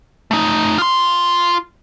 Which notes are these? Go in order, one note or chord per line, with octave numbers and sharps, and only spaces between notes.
A3 D#4
F4 C6